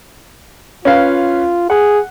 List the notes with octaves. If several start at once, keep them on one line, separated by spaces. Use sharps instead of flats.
C#4 F4 B4 F5
G#4 F#5